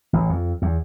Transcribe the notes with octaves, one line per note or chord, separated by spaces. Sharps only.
A1
F2
E2